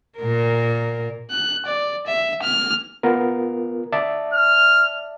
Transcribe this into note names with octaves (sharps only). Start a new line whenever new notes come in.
A#2 A#4
F#6
D5
E5
F6
B3 F4 A#4
D5 E5 A5
F6